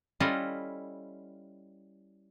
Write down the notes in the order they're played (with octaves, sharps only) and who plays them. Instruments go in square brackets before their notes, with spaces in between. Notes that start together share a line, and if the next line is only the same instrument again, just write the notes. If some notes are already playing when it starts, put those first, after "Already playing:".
[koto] G3 C#4 E4 F4 A4 D#5